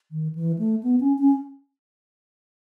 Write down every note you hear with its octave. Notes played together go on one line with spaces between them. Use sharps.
D#3
E3
A3
B3
C#4
C#4